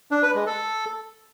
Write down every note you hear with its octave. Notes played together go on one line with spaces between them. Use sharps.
D4
B4
G#3
A4